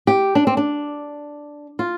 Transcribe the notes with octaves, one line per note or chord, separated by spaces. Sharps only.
G4
D4
C4
D4
F4